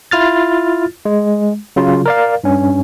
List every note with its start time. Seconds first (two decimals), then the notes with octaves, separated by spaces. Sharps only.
0.11 E4 F4 F6 A6
1.05 G#3
1.76 C#3 F#3 F4
2.06 A#4 D5 F5
2.44 G2 C#4